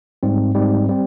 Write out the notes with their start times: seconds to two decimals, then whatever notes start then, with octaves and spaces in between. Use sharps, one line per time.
0.23 G#2 G3 C4
0.54 G#2 G3 C4
0.89 G3 C4